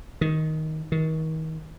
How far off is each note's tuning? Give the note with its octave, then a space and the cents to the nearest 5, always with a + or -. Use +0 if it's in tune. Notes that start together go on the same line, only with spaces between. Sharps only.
D#3 +10
D#3 +35